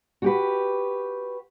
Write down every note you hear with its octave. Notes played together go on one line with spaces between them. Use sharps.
F#4 G4 B4